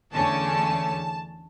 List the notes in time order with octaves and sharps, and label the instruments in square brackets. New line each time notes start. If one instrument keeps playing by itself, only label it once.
[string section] E2 D3 A3 C#4 A5